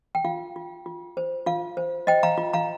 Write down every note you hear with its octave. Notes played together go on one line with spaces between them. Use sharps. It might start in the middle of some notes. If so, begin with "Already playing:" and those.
G5
F4 F5
F4
F4
C5
F4 F5
C5
C5 D#5 G5
F5 A#5
F4
F5 A#5